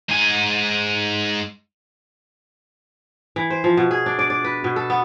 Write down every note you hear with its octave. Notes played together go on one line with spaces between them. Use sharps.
G#2 G#5
E3
C5
F3
B2
G#4
D4
D5
D5
B4
B2
A4
B3